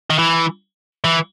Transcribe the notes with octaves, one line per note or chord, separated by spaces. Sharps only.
D#3
E3
E3